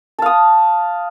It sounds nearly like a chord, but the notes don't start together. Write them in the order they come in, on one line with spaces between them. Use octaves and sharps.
A5 F5 D#6